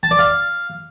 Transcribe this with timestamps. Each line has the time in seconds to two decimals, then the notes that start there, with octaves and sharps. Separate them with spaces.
0.03 A5
0.11 D5
0.19 F5